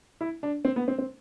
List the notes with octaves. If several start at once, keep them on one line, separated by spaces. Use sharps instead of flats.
E4
D4
C4
B3
C4
C4